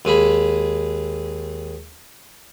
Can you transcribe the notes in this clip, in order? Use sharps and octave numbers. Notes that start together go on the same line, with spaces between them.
D#2 G#3 G#4 B5